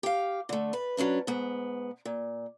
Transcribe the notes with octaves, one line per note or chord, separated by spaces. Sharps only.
G4 F5
D3 A3
B4
F#3 C#4 D4 B4
G#2 B3
A#2